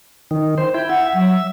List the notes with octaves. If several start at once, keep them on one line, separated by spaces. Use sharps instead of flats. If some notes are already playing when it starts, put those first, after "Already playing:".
D#3
C5
E4 G5
E5 F#5
F#3